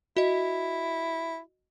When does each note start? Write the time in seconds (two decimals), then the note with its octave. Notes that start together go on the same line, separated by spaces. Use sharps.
0.17 E4 F#4 D#5